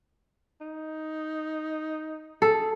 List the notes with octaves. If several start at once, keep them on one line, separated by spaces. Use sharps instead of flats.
D#4
G#4 A4